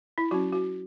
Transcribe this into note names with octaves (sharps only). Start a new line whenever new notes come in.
E4
F#3 C#4 F#4
F#4